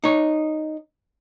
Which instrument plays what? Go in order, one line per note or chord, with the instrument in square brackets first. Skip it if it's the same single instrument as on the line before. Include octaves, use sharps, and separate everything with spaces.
[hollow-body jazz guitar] D#4 C#5